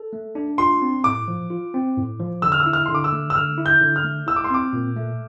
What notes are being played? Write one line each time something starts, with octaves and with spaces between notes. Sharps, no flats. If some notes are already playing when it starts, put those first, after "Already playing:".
Already playing: A4
A3
D4
F4 C6
C4
A2 D6
F3
F4
C4
A2
F3
D3 E6
F6
E6
E4
F6
D3 C6
D6
E6
A3
E6
D3 F6
E4
G6
D3
F6
A3
E4 E6
D6
C6
C4 D6
A#2
A3